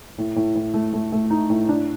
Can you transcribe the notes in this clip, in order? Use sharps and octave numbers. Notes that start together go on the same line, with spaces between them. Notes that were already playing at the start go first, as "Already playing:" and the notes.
A2
A2
A2
A3
A3
A3
D#4
A2
D4